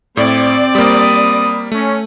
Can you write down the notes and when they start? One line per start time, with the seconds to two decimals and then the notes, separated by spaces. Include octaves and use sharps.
0.17 A2 C4 D5
0.75 G3 A#3 B5 D#6
1.72 A3 C#4